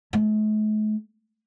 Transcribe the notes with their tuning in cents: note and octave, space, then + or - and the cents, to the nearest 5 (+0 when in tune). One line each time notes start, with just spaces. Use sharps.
A3 -45